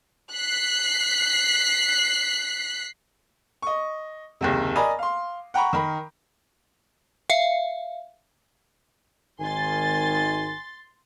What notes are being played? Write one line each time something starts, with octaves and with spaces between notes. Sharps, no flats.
F#6 B6 C7
D#5 C#6
F#1 D#2 C3
A#4 D5 D#5 G#5 A#5 B5
F5 C6
F#5 G5 A#5 B5 C#6
D#3 A#4 B5
E5 F5
G#1 D#3 G#5 C6 A6